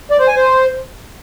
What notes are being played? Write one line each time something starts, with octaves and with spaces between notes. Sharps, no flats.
D5
C5
G#5
C5